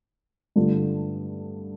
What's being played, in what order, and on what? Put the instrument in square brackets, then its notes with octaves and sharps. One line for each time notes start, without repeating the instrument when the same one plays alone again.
[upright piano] G2 D3 A3 F4